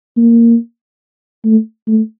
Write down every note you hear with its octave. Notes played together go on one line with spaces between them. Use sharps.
A#3
A3
A3